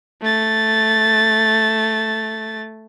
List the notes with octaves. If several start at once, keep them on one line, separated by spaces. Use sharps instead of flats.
A3 A6